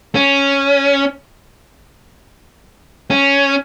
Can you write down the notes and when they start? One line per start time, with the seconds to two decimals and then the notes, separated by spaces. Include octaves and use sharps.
0.15 C#4
3.11 C#4